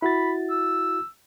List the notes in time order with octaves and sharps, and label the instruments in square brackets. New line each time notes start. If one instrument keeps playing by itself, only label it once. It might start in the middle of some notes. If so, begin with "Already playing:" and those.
[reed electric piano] E4 F#4 A6 [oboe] B5
[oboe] E6